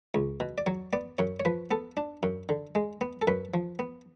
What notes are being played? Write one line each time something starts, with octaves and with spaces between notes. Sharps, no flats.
C#2
B2
D5
F#3 C#5
B3 D5
F#2 C#5
C#5
F3 B4
B3 A4
D4
F#2
D3
G#3
B3
A4
F#2 B4
F3
B3